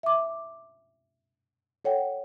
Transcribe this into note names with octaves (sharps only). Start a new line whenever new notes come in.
E5 D6
A4 C#5 F#5 G5